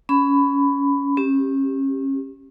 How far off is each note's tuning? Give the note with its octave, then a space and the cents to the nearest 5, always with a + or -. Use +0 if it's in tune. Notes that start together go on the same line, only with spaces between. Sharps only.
C#4 +15 B5 +15
C#4 -30 G4 +0